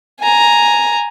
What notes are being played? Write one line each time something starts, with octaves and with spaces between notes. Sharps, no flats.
G#5 A#5